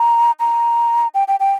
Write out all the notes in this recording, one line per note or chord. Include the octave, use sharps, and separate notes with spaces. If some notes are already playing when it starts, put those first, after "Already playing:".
Already playing: A#5
A#5
G5
G5
G5